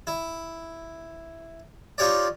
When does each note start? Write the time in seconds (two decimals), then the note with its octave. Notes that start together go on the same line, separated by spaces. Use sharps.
0.07 E4
1.98 D#4 F4 G4 C#5 D5